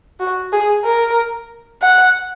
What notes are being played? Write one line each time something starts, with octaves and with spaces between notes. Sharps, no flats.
F#4
G#4
A#4
F#5